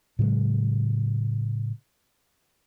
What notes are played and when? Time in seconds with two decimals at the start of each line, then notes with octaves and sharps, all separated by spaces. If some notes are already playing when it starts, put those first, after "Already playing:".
0.19 A2 C#3 F#3 G#3